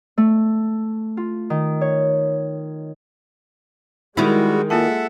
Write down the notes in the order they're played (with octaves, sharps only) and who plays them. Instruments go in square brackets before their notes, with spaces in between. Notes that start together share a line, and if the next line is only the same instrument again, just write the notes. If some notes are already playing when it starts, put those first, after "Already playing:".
[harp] A3
F4
D#3
C#5
[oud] D#3 E4 [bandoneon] G3 F#4 [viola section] G#3 [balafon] D#4
[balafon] A#3 F4 A5 [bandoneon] A4 E5 F#5